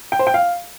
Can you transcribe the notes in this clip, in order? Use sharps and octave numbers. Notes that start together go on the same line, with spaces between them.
G5
C5
G5
F5